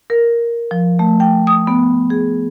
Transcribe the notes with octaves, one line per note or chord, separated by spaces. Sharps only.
A#4
F3
A3
G5
D#6
B3
G#4